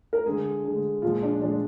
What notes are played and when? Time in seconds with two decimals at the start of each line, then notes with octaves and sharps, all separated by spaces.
0.13 A#4
0.25 D3 G#3 G#4
0.64 D3 G#3
1.02 A#2 F3 G#3 F4
1.22 D4
1.41 A#2 F3 G#3 D4